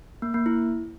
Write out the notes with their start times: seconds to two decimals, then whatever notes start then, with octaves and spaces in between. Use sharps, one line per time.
0.22 A#3
0.34 A#3
0.46 E4